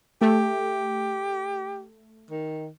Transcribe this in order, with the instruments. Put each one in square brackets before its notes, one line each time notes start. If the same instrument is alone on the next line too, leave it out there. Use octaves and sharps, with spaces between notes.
[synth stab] A3 [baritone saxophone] G4
[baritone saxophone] D#3